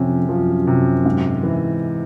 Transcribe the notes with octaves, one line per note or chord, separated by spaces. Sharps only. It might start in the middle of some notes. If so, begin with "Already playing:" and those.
Already playing: F2 C3 C#4
F#2 F3
C3
G#2
E3